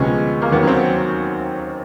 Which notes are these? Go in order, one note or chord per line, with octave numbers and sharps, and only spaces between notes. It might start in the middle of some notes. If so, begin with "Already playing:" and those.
Already playing: D2 C3 F3 G#3 B3 C#4
A#3
D#2 D#3 F#3 B3
C#4
C4